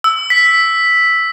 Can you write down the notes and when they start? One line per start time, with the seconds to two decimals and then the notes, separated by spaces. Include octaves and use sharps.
0.04 E6
0.30 B6